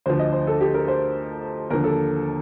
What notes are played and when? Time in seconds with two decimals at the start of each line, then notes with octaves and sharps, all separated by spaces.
0.06 D2 D3 F3 C5
0.19 D#5
0.33 C5
0.47 A4
0.61 G4
0.74 A#4
0.88 C5
1.70 D#2 D3 F3 A#4
1.84 A4